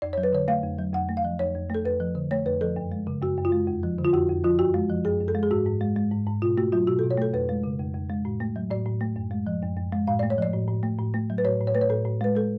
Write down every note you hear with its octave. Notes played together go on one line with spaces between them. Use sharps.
F2 D5
F#3 C#5
B4
D3 C#5
A3 F5
F2
F#3
F2 F#5
A3
F5
F3
F2 C#5
F2
A3 A4
F2 B4
F3
D3
A3 C#5
F2 B4
F3 A4
F#2
G#3
C#3
F#2 F#4
F#2
F4
G#3
F2
F3
D3
F4
F2 F#4
F2
F3 F4
F#2 F#4
G#3
F3
F#2 G#4
F#2
A4
G#3
G#4
G#2 F#4
G#2
G#3
G#3
G#2
G#2
B2 F4
A3 F#4
F#3 F4
B2 F#4
B2 A4
C#5
A3 A4
F2 B4
G#3
C#3
F2
F2
G#3
A2
A3
F#3
A2 D5
A2
A3
F#2
G#3
F3
F#2
F#2
G#3
A2 F5
A3 D5
C#5
F3 D5
A2
A2
A3
A2
A3
F#3
B4
A2 C#5
A2
C#5
A3 B4
C#5
A2 A4
A2
G#3 B4
G#3 A4